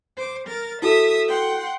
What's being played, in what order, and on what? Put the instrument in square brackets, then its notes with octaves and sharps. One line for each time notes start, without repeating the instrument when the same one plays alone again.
[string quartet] C5 D6
A#4 A6
[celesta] E4 F#4 A4 [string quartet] E5 D#6 E6
[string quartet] F#5 G5 C6